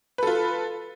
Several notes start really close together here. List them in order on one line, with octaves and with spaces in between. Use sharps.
B4 A4 F4